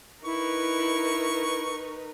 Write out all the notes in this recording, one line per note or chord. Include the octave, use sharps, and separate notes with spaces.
D#4 E4 A#4 B4 C#6